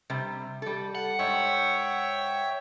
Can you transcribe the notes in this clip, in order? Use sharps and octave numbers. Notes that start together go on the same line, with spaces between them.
C3 G3
G3 A4
F#5
G#2 C#5 E5 G5